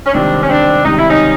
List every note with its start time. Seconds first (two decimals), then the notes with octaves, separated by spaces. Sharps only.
0.06 C#4
0.14 C#2 C3 D#3 G3 C4 D4
0.42 C#4
0.49 C4 D4
0.85 C#2 C3 D#3 G3 D#4
0.98 E4
1.09 C#4 D#4